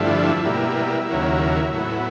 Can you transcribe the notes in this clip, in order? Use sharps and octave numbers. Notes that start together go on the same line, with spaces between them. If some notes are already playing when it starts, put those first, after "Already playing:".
Already playing: G2 D3 F3 A3 E4
B2 G3 A#3
D#2 C#3 F#3 A#3
A2 F#3 B3 E4